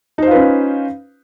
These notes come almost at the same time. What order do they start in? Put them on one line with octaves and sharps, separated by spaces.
D#4 C5 F4 B4 C#4